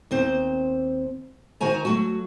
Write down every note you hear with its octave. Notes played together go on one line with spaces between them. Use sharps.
D#2 C4 C5
D#3 F#4 C5 G#5 A#5
F#3 A3 F#4